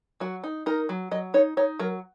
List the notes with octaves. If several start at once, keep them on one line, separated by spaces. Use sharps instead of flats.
F#3 F#4
D#4
D#4 A#4
F#3
F#3 D#5
D#4 C#5
D#4 C#5
F#3 A#4